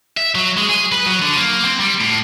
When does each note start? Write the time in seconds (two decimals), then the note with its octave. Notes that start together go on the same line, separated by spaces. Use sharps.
0.17 E5
0.35 F#3
0.57 G#3
0.69 G#4
0.92 B4
1.07 F#3
1.22 D3
1.37 A#3
1.65 C4
1.80 G3
2.00 A2